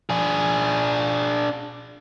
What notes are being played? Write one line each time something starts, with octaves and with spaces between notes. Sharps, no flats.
D4 G#4